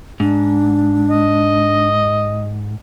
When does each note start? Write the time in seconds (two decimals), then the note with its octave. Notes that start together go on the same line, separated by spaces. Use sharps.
0.20 G#2 D4
1.09 D#5